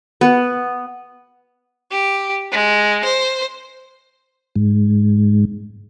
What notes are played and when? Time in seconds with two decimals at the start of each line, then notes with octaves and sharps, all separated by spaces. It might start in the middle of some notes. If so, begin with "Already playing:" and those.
0.21 B3
1.91 G4
2.52 G#3
3.04 C5
4.56 G#2